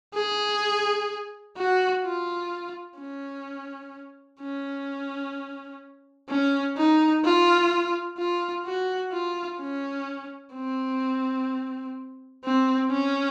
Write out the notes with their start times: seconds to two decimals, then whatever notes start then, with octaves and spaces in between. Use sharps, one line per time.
0.14 G#4
1.56 F#4
2.04 F4
2.98 C#4
4.40 C#4
6.29 C#4
6.77 D#4
7.24 F4
8.18 F4
8.65 F#4
9.12 F4
9.60 C#4
10.54 C4
12.44 C4
12.91 C#4